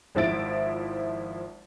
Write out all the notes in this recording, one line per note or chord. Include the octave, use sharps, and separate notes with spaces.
G#1 F3 E4 A6 D7